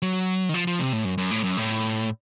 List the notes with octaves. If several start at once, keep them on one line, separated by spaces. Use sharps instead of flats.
F#3
D#3
F3
F3
C3
A2
F#2
F#2
A2
F#2
A2